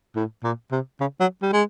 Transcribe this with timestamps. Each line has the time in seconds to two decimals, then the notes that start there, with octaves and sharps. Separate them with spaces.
0.16 A2
0.44 A#2
0.72 C3
1.00 C#3
1.20 F#3
1.42 G3
1.53 G#3